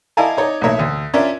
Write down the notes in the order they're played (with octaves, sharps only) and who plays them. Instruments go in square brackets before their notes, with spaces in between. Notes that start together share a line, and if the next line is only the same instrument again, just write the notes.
[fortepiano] E4 D5 D#5 F5 G#5 A5
D#4 C#5 D5
B1 A2 A#3 C#5 E5
D2
C#4 D4 F4 A#4 D5 E5